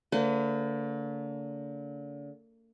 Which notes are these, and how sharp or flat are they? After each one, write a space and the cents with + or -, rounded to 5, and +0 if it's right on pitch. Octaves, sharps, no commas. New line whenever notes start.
D3 -40 A#3 -45 B4 +40